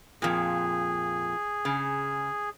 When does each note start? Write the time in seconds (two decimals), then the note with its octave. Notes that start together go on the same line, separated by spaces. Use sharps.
0.22 F2 A#2 G#4
1.65 C#3